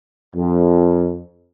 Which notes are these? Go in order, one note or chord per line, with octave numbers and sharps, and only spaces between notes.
F2